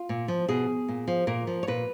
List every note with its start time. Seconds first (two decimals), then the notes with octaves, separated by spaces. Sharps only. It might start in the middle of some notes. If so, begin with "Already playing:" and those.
Already playing: F4
0.09 A#2
0.28 F3
0.48 B2 G#4
0.88 A#2
1.08 F3
1.27 A#2 A#4
1.47 F3
1.63 C#5
1.67 A#2 B4